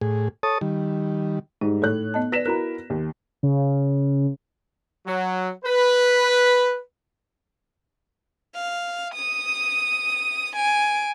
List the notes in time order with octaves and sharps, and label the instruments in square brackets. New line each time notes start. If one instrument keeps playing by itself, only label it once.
[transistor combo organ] A2 G#4
A4 C#5 A5 D#6
D#3 G3
[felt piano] G#2 G3 [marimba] D#4
[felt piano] A2 C#5 F#6 [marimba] A4
[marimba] B3 D#5 A5
[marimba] B4 D5 [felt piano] A#6 B6 E7
[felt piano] E4 F#4 A#4 [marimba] A#5 F#6
[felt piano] D#2
[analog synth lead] C#3
[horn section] F#3
B4
[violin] F5
D#6 D#7
G#5 D7